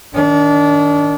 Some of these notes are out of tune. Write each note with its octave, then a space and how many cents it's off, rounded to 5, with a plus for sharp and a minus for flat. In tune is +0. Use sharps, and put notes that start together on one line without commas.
D#3 +0 D4 -30